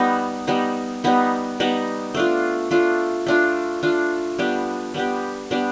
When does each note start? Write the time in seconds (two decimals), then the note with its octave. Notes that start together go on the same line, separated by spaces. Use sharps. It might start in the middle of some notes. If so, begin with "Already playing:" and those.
Already playing: G3 B3 D#4
0.47 G3 B3 D#4
1.04 G3 B3 D#4
1.60 G3 B3 D#4
2.15 A3 D4 F4
2.71 A3 D4 F4
3.27 A3 D4 F4
3.83 A3 D4 F4
4.39 G3 B3 D4 G4
4.94 G3 B3 D4 G4
5.51 G3 B3 D4 G4